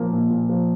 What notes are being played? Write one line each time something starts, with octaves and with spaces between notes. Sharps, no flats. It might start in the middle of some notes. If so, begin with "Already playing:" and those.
Already playing: A#2 F3 A#3
A#2
A#2
F3